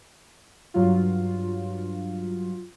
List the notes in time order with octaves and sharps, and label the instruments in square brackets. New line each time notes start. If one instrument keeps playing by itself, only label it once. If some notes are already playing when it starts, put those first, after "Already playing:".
[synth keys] G2 F#3 F4